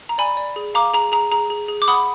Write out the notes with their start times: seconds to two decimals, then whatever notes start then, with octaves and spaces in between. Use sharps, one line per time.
0.09 A#5
0.18 D5 G#5 B5
0.37 D5
0.56 G#4
0.74 F5 A#5 D6
0.94 G#4 A#5
1.12 G#4 A#5
1.32 G#4 A#5
1.50 G#4
1.68 G#4
1.82 D6
1.88 F#5 B5 D#6